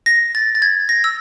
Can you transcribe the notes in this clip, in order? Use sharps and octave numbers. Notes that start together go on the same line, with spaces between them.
A#6
A6
A6
G#6
A#6
E6